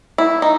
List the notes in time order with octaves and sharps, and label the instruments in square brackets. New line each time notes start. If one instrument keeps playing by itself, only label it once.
[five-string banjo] E4
D#4